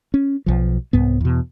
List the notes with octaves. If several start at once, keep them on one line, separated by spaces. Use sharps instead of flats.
C#4
B1 F3
C2 G#2 B3
E2 B2